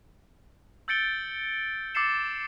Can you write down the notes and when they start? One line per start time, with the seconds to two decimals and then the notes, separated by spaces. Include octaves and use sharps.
0.88 E6 G6 A6 C#7 D7 G7
1.95 D6 E6 A6 C7 C#7 E7